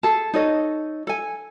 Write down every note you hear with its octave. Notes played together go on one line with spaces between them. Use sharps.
G#4 A4 A5
D#4 A4 C#5 D#5
A4 G#5